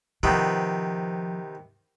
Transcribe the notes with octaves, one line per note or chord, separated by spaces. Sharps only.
C3 D#3 F3 B3